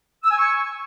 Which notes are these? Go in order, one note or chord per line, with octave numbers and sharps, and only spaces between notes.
E6
G#5
C#6